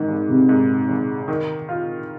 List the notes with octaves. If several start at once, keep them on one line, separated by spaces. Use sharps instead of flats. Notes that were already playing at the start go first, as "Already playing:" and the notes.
Already playing: G#2 D#3
G#1
C3
G#2
G#1
D#3
F4